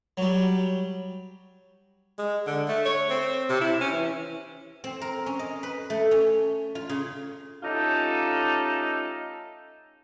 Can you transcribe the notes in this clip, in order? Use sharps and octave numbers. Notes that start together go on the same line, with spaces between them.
F#3 G3
G#3
D3
A3
C#5
C4
C3
E4
C#4
E3
C4
A#4
C#4
D#5
B4
A3
C#4
F4
C#3
A3 C#4 D#4 F4 G4 A4